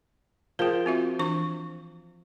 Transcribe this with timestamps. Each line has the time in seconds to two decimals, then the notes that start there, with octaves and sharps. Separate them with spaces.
0.59 F3 G#4 A#4 G5
0.86 C4 F#4 E5
1.19 E3 D4 C#6